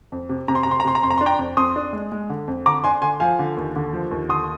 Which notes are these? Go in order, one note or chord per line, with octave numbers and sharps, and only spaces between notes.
F2
C3
C3 A#5
C6
C3 A#5
C6
A#5
C3 C6
A#5
F2 C6
A#5
C6
D4
G5 A#5
F2
F2 C6 D#6
D4
G#3
G#3
D3
F2
D3 A#5 D6
D4 G#5 C6
D3 G#5 C6
F3 F5 G#5
D3
D#2
D3
F3
D#2
D3 C6 D#6